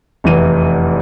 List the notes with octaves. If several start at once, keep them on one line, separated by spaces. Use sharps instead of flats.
F1 E2 E3 D#7